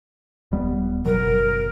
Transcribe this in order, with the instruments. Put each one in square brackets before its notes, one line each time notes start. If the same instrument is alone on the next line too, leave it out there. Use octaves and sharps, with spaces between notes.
[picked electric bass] D#1 G3 B3
[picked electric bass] F#1 B2 F#3 [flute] A#4